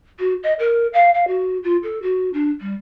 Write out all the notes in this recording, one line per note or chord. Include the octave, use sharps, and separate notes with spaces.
F#4
D#5
A#4
F5
F5
F#4
F4
A4
F#4
D4
G3